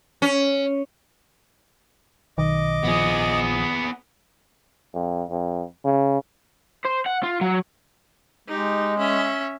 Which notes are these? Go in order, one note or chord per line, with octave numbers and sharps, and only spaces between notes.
C#4
B1 D#3 D#5 D6
A#1 F3 B3 G#4
F2
F2
C#3
C5
F#5
F4
F#3
G#3 D#4 G4
C#4 E5